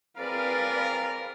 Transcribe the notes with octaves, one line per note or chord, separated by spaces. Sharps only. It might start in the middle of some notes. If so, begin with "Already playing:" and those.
C4 G#4 A#4 B4 D5 F5